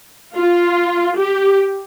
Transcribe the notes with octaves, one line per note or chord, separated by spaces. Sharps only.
F4
G4